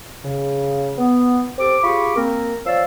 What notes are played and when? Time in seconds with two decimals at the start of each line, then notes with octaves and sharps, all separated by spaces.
0.24 C#3
0.98 B3
1.59 C4 G4 A4 D6
1.84 F4 G4 G#4 B5 C#6 D6
2.16 A#3 C4 A#4
2.66 F3 C#5 D5 F5 E6